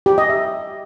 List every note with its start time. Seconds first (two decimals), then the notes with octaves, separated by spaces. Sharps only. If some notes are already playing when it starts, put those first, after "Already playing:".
0.06 G4
0.18 D#5
0.29 E5